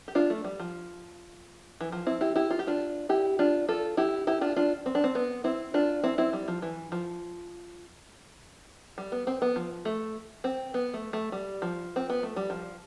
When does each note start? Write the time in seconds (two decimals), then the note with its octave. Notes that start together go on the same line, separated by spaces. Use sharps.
0.08 G4
0.15 D4 F4
0.30 A3
0.44 G3
0.59 F3
1.81 E3
1.92 F3
2.07 C4 E4
2.21 E4 G4
2.36 E4 G4
2.50 F4
2.59 G4
2.67 D4 F4
3.09 E4 G4
3.39 D4 F4
3.68 F4 A4
3.97 E4 G4
4.27 E4 G4
4.41 D4 F4
4.56 D4 F4
4.86 C4
4.95 D4
5.04 C4
5.15 B3
5.44 C4 E4
5.74 D4 F4
6.03 C4 E4
6.18 C4 E4
6.33 G3
6.48 F3
6.62 E3
6.92 F3
8.98 G3
9.12 B3
9.27 C4
9.42 B3
9.56 F3
9.85 A3
10.44 C4
10.74 B3
10.94 A3
11.13 A3
11.32 G3
11.62 F3
11.96 C4
12.10 B3
12.23 A3
12.36 G3
12.50 F3